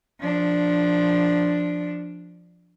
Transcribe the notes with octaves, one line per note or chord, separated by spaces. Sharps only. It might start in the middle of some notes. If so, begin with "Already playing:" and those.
F3 D4